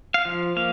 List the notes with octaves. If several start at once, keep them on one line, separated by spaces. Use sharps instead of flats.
F5
F3
A#3 F5